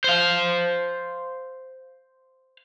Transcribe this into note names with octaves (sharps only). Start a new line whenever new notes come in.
C5 F5